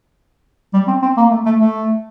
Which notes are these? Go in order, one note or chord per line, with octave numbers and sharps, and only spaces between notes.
G3
C4
C4
A#3
A3
A3
A3